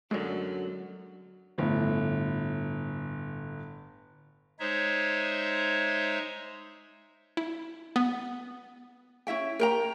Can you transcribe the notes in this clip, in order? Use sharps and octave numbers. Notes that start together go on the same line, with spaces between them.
F#2 D3 F#3 G#3
G1 A2
G#3 D#4 C5 C#5 E5
E4
B3
C#4 E4 E5 G5
A#4 G5 A#5